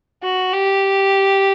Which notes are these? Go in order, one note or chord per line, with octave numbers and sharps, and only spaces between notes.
F#4
G4